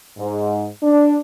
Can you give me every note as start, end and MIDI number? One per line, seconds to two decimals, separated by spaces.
0.18 0.67 44
0.83 1.17 62